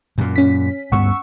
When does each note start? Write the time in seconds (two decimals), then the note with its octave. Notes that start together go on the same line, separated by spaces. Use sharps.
0.18 F#2 A#2
0.36 C#4 B6
0.92 D2 G2 B3 F#5 C#6 E6